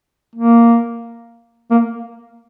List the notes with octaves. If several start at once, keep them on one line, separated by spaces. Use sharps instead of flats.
A#3
A#3